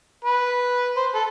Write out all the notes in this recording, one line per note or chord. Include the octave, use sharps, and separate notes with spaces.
B4
C5
A4